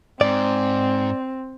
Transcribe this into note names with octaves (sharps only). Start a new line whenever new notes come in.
G#2 C4 D5